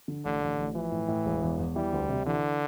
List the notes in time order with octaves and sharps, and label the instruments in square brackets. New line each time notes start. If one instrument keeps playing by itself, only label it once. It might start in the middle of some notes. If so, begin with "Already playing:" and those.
[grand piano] D3
[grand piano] A1 [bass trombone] D3
[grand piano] A1
A1
[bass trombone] E3 [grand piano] F3
[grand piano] A2
A2
E1
E2
E2
[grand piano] E3 [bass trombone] G3
[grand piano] D2
C3
[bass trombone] D3 [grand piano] E3